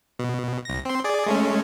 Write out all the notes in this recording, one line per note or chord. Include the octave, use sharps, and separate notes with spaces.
B2
C2 A#6
C4 C6
G#4 D5
G#3 A3 C#4